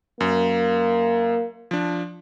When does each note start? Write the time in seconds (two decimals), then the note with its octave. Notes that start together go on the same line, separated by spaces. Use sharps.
0.20 F#2 A#3
1.71 F3 D4